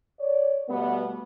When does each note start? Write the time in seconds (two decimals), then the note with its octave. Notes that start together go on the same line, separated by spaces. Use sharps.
0.19 C#5 D5
0.69 B2 G3 A3 B3